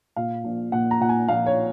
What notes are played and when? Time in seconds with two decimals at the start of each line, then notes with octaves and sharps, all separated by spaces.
0.16 A#2 F5
0.44 A#1
0.72 A#2 F#5
0.91 A#5
1.01 A#2 F#5
1.09 G#5
1.28 A#1 F5
1.46 C#5